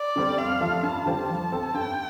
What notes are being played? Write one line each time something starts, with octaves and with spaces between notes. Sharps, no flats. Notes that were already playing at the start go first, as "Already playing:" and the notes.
Already playing: D5
D3 G3 C4
F2 F5
F3 A3 F4 A4
G2 A5
D3 G3 F4 C5
F3 A5
C4 A4
G2 G5